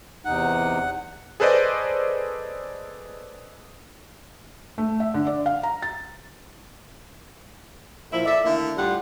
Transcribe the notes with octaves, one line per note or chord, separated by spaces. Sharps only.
E2 C3 D#4 F#5
G#4 A4 B4 C5 D5 D#5
A3
E5
D3
D5
F5
A#5
A6
A#2 F3 E4 E5
A4 D5 E5
D3 D#3 A3 A#3 E4
A2 G3 F4 G4 F#5